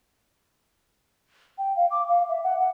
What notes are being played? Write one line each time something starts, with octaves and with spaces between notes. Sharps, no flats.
G5
F5
D6
F5
E5
F#5
F#5